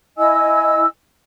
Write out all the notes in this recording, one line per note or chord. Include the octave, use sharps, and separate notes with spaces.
E4 D#5 G#5 E6